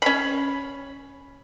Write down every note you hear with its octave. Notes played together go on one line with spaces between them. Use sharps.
C#4 B5